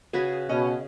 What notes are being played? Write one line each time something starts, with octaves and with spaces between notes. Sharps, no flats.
C#3 F#4 G#4 B4
B2 C#4 D#5